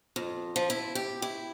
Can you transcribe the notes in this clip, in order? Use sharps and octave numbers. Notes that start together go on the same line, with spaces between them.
F2
F3
E4
G4
E4